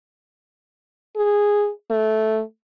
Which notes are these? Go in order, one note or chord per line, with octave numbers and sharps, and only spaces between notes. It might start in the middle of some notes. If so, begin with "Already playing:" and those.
G#4
A3